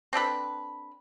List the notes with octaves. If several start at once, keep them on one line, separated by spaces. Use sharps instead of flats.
C4 D4 A4 B4